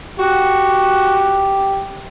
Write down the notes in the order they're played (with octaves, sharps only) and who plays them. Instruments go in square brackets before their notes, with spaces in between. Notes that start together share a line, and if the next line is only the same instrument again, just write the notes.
[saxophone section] F#4 [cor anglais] G4